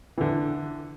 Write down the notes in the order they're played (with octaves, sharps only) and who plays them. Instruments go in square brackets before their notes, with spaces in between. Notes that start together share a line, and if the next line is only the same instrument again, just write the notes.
[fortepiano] D3 E3